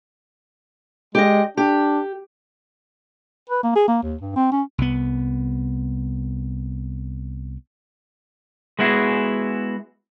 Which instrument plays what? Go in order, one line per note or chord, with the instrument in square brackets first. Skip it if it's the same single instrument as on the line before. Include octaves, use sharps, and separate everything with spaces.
[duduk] G#3 [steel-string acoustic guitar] G4 D#5
[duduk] D4 [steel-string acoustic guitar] G4
[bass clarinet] B4
A#3
G#4
A#3
D#2
G2
C4
C#4
[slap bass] C2 B3
[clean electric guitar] G#3 B3 E4 F#4 G#4